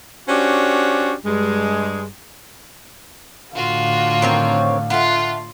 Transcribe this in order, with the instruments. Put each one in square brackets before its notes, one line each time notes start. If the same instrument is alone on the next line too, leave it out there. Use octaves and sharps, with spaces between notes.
[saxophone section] C#4 D4 F#4 G4 C5
G2 G#3
[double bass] A2 D3 [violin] F4 F#4 [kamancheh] F5
[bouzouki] D#3 C4 C#5
[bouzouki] A3 F#5 [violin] F4